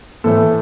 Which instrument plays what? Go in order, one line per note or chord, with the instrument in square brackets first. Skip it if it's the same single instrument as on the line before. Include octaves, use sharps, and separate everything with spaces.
[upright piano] A2 E3 A3 A4